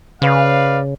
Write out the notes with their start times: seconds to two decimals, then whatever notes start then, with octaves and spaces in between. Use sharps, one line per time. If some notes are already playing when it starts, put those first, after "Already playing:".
0.22 C#3 B4 D5 F5